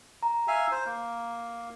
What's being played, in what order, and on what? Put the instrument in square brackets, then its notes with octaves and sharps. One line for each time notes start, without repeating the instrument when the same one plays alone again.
[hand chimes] A#5
[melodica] E5 F5 G#5
C5
A#3